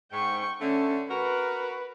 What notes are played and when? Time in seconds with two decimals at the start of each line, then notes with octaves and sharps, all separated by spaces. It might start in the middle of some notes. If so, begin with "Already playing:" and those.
0.12 G#2 G5 C#6
0.61 D3 A3 C#4
1.09 F#4 A#4 B4